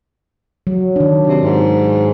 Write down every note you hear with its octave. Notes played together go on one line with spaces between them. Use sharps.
F#3
D#3 D4
C3
G#2